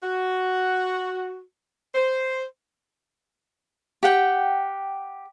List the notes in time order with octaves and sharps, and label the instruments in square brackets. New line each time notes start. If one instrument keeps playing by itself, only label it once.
[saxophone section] F#4
C5
[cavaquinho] G4 F#5 G5